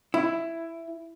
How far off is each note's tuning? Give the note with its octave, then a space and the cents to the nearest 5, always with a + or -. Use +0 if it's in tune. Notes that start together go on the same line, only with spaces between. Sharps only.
E4 +10